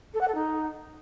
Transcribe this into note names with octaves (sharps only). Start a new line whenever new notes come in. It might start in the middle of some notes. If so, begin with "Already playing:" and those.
A4
F#5
A4
D#4